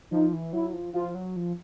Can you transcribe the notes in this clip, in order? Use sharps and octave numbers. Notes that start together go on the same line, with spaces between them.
F3 D#4
E3
F#3 E4
F3
F3 F4
F#3
F3